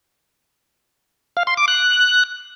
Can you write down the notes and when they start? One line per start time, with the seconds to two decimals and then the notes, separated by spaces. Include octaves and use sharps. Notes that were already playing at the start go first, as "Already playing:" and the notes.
1.37 F5
1.47 C6
1.57 D6
1.68 F#6